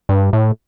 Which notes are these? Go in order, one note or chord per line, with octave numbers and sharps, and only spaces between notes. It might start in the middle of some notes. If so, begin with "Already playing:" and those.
G2
A2